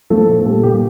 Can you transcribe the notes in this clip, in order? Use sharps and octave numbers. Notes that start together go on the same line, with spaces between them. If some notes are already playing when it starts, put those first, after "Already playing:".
F3 A3 A4
A#2
G3 A3 A4
A#2 G3 G4